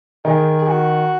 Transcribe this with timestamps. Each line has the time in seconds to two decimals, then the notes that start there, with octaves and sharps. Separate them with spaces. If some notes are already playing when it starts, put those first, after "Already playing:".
0.25 D#3 G#4
0.58 G#4
0.67 F#4